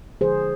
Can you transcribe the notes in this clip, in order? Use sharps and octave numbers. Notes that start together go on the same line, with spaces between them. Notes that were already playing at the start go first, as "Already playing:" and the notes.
D3 F3 G#3 G#4 C5